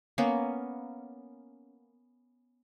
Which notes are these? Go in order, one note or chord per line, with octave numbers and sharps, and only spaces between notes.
A#3 B3 C#4